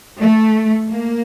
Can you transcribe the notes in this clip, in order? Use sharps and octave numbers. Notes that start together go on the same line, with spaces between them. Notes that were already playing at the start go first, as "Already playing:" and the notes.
A3
A#3